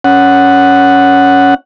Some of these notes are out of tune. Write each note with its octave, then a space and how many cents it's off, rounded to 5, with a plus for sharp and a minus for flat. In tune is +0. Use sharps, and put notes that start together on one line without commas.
C#4 +10 F#5 +0